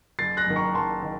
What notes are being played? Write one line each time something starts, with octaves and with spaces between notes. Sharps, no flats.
F#1 A6 C7
F#6 A#6
F#2 D#3
A#5 C#6
F#1 A5 C6
D#3